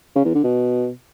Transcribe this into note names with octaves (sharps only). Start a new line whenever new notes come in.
C#3
E2
D3
B2